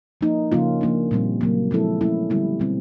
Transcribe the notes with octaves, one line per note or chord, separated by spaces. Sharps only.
F3 A#3 D#4
C#3 F3 A#3 C#4 F4
F3 A#3 D4
A#2 G3 C4
C#3 F#3 A#3
F3 G#3 C4 E4 A4
F3 A3 C#4 E4
D3 G3 B3 E4
B2 G3 C4